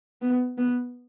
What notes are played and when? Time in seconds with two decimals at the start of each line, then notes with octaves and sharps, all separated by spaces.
0.22 B3
0.58 B3